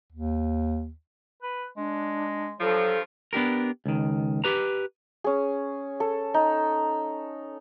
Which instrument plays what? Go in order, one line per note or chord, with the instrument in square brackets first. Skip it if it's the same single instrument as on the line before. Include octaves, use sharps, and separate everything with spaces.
[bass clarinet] D#2
B4
[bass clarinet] G#3 [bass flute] D4
[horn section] G2 F3 [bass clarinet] F#3 [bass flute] A4
[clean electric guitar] B3 D4 G4 A#4
C#2 D#3
G4 B4 A#5
[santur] C#4 G#4
A4
D#4